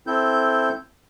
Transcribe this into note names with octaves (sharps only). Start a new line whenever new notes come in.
C4 E4 A4 G6